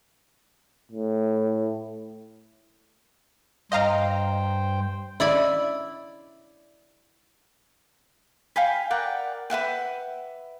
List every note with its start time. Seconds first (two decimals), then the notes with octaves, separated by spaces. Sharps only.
0.92 A2
3.72 G2 C5 D#5 F5 G5 A#5
5.20 E4 D5 B5
8.56 F5 G5 G#5 B5
8.91 A#4 D5 F#5 G5
9.50 B4 E5 F#5 G5